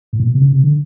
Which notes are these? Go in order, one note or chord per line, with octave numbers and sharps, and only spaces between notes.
A2
A#2
B2
C3
C#3
C3
D3